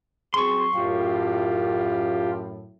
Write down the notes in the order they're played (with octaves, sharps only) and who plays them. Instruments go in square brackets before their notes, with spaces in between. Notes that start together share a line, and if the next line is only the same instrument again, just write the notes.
[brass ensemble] F#3 C4 G#4 [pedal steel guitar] C6 C#6
[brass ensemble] F#2 A2 [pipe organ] F4 G4